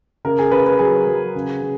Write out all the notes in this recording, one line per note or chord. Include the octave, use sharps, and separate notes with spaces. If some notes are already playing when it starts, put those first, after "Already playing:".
C#3 A#4
G#4
C#3 B4
B4
F#3 G#4
F#3
C#3
C#3